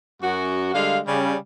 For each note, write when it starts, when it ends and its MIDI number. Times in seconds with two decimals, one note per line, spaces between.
0.22 0.73 42
0.22 0.73 66
0.74 1.00 50
0.74 1.00 55
0.74 1.00 56
0.74 1.00 77
1.07 1.35 49
1.07 1.35 55